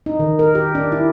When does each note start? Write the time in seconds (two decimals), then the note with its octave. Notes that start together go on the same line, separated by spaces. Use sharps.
0.06 D#4
0.20 D#3
0.39 A#4
0.55 G4
0.75 D4
0.92 E4